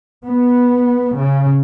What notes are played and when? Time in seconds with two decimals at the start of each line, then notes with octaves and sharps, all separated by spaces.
0.25 B3
1.17 C#3